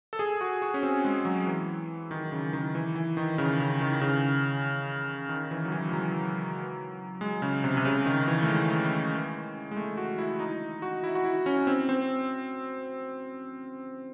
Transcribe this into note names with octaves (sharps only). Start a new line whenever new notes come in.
A4
G#4
F#4
F#4
C#4
C4
G#3
F#3
E3
D#3
C#3
D#3
E3
E3
D#3
C#3
C#3
D#3
C#3
D#3
E3
F#3
E3
G#3
F#3
G#3
C#3
C3
C3
C#3
D#3
E3
A3
G#3
G#3
A3
F#4
E4
D#4
F#4
E4
F#4
E4
C#4
C4
C4